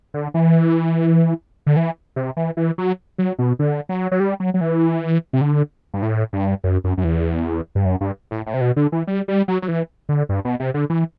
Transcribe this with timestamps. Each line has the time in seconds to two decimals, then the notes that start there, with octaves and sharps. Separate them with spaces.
0.14 D3
0.34 E3
1.66 D3
1.76 E3
2.16 C3
2.37 E3
2.57 E3
2.78 F#3
3.18 F#3
3.39 B2
3.59 D3
3.89 F#3
4.12 F#3
4.20 G3
4.40 F#3
4.54 F#3
4.61 E3
5.33 C3
5.41 D3
5.94 G2
6.02 A2
6.33 G2
6.64 F#2
6.84 F#2
6.98 F#2
7.04 E2
7.75 G2
7.85 F#2
8.01 G2
8.31 A2
8.46 A2
8.54 C3
8.61 B2
8.76 D3
8.92 E3
9.07 G3
9.28 G3
9.48 F#3
9.62 F#3
9.68 E3
10.09 D3
10.29 G2
10.45 B2
10.60 C3
10.74 D3
10.90 E3